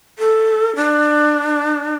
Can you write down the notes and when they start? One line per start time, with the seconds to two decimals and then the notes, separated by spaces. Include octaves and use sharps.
0.19 A4
0.76 D4